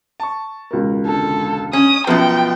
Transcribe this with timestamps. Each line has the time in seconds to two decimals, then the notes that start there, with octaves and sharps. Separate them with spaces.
0.20 A5 C#6
0.71 E1 C#2 A#4
1.07 D3 A4
1.73 C#4 D#6
2.07 F#2 B2 F3 B3 G5 A5 A#5 D#6